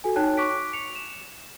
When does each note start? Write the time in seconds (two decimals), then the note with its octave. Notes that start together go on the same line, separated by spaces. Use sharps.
0.04 F#4 A4 G#5
0.16 D#4 C#5 G5 A5 F#6
0.37 C#6 D6 F#6 B6 D7
0.73 C#7 F7
0.95 E7